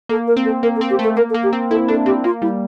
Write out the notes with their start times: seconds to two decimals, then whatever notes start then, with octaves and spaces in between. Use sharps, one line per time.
0.09 A#3 A4
0.27 A#4
0.36 C4
0.45 A4
0.63 A#3 A#4
0.76 A4
0.81 C4
0.90 G4
0.99 A3 A4
1.17 A#3 A#4
1.30 A4
1.34 A#3
1.43 G4
1.53 C4
1.70 E4 A4
1.88 D4 A4
2.06 C4 G4
2.24 A#3 F4
2.42 G3 E4